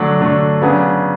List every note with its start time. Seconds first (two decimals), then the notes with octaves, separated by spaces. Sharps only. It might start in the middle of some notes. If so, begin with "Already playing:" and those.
Already playing: D3 F#3 A3 D4
0.21 D3 F#3 A3 D4
0.62 C#3 F#3 B3 D4 G#4